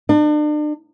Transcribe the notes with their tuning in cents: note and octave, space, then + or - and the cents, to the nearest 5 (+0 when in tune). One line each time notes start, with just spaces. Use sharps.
D4 +40